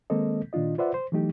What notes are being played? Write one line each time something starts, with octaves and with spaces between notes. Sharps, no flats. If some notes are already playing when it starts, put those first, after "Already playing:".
D#3 G#3 A#3 C4 A4 D#5
A#2 D#3 D4 F4 D#5
F4 B4 C5 D5 E5 F#5
C5
E3 F#3 A3 D#4 G4